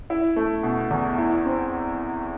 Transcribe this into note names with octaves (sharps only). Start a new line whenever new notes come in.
E4
A3
B2
E2
E4
C4